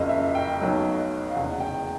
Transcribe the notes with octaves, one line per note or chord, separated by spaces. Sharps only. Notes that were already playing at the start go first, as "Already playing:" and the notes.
Already playing: F#1 F2 C#3 D#5
E5
G5
B1 B2 F#3 A3
F5
F1 E2 C#3 F#5
G5